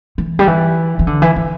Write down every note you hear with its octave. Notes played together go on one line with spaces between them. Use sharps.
E3
G3
E3
E3
D3
E3
E3